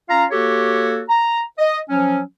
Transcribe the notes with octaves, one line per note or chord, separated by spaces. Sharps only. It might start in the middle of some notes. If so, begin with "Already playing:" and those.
C#4 F4 F5 A#5
A#3 F#4 G4 A4 C#5
A#5
D#5
F3 F#3 C#4